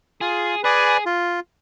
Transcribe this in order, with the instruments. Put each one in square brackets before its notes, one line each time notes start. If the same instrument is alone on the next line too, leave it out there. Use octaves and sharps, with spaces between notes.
[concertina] F4 [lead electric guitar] G#4
[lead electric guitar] G#4 [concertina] B4 D5 G#5
[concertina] F4